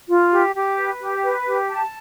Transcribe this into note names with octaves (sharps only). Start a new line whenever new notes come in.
F4
G4
G4
B4
G4
B4
G4
A5